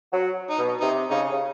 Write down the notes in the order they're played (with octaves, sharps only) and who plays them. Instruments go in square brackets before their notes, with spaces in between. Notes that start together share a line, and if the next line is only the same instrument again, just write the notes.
[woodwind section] F#3
[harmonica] D#4
[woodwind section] B2
[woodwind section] C3 [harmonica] D#4
[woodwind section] C#3 [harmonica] D#4
[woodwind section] C#3